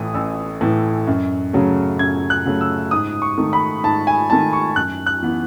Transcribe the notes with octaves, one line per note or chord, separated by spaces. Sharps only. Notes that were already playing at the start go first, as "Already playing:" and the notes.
Already playing: A1 A2 E3 D#6
A1 E6
A2 E3
F#2
C#3 F#3 A3
F#2 G#6
F#6
C#3 F#3 A3
E6
G#2 D#6
C#6
D#3 A3 D#4
B5
G#2 A5
G#5
D#3 A3 D#4 A5
C#6
F#2 F#6
F#6
E3 B3